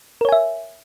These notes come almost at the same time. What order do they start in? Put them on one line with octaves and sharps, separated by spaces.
A#4 C#5 G#5 E5